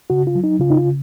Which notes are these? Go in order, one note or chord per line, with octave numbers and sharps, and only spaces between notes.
C#3 F#4
F4
F#3
D#4
C#3 F4
D#4
F4